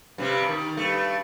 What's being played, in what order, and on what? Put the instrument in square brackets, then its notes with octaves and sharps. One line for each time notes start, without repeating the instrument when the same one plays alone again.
[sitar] G2 C3 G3
D#3
G2 A3